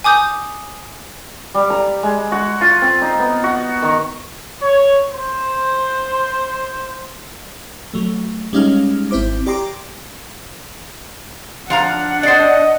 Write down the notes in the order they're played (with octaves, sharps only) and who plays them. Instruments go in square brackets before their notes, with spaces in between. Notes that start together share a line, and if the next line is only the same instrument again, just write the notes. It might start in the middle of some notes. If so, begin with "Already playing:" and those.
[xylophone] G#5 D6 D#6 G6
[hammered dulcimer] G3
A#5
G#3
F#4
F4
C4
D#4
B3
F#4
D#3
[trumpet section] C#5
C5
[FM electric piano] F#3 A3
G3 G#3 C#4 D#4 F5 F6
G#1 C4 E4 C5 D6
G4 D5 G5 A#5 C6 D6
[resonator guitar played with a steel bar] F3 F5 A#5 [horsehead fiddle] D4 F#5
[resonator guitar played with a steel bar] C5 D5 [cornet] D#5